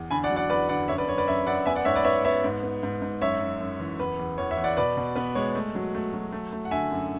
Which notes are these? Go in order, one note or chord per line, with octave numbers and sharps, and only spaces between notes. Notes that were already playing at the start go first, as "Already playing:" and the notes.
Already playing: E2
D3 G#5 B5
D5 F#5
F#3
D5 F#5
E2 B4 D5
D3 D5 F#5
F#2 C#5 E5
B4 D5
F#2 C#5
B4 D5
F#2 C#5 E5
F#2 D5 F#5
B3 E5 G#5
D5 F#5
G#2 C#5 E5
B4 D5
B3 C#5 E5
B3 C#5 E5
G#2
B3
G#2
G#2
F#2 C#5 E5
F#2
F#2
E3
E2 B4
E2
E2 C#5
C#5 E5
E2
D5 F#5
B2 B4 D5
B2
B3 B4
G#3 C#5
A3
F#3
A3
F#3
A3
A3
F#5
D3 E5 G#5
F#2